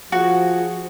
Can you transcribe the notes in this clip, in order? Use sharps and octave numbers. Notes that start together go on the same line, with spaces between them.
F3 F#4 G#4